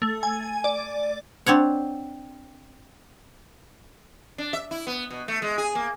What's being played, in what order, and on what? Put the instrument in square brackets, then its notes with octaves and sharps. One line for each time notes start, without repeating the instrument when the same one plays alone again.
[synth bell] A3
G#5
D5
[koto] C4 D4 C#5 F#5
[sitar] D4
E5
E4
B3
B2
A3
G#3
G#4
A#3